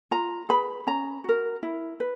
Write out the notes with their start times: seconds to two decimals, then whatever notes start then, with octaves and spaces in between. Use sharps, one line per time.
0.11 F4 A#5
0.49 G#4 B4 B5
0.87 C#4 A#5
1.24 F#4 A#4
1.63 E4
2.00 B4